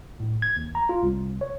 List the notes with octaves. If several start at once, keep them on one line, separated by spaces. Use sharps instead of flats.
A2
G#6
D#2
A#5
F4
C2
C#5